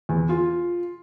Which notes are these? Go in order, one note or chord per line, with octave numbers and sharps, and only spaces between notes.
E2
F4